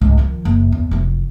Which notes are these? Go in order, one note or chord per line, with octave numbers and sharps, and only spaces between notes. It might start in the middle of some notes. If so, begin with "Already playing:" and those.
C#2 G#2
D#3 F3
F#1
E2
F1 E3